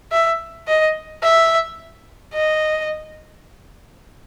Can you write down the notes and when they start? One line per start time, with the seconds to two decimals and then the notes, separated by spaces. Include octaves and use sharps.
0.12 E5
0.67 D#5
1.23 E5
2.34 D#5